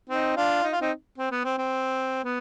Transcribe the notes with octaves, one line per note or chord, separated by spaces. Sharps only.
C4 D#4
D4 F4
D#4
F4
C4 D#4
C4
B3
C4
C4
B3